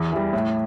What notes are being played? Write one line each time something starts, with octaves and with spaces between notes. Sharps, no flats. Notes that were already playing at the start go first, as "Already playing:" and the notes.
Already playing: E2
E3 G3
A2